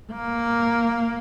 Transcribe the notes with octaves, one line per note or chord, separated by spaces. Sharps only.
A#3